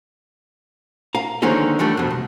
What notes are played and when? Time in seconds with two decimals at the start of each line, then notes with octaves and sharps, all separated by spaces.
1.15 F5 A#5
1.42 D3 D#3 F3 G#3 A#3 C#4
1.79 D3 E3 G3 A3
1.97 F2 B2
2.11 C2